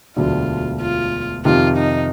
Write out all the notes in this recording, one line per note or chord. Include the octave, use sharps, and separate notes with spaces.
E1 D2 D3 F#3 F4
F4
F2 C3 D#3 F4
D#4